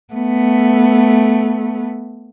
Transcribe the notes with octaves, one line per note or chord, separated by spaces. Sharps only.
A3 B3